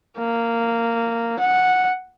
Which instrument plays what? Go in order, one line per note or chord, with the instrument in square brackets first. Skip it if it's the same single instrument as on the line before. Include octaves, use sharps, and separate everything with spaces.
[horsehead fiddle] A#3
F#5